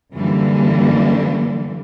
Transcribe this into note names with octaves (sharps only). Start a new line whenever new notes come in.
F#2 D3 E3 G3 A#3